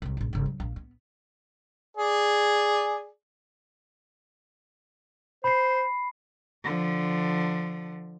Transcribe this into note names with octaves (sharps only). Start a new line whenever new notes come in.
C2 G3
A#1 G2
G1 C#3
F#3
A#1 A#3
B3
G#4 D5
C5 B5 C7
D3 F3